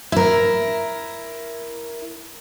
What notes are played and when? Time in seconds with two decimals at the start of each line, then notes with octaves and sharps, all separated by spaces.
0.12 E4 A#4